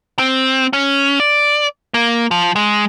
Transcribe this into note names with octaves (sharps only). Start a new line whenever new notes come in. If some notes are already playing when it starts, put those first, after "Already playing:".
C4
C#4
D5
A#3
F3
G#3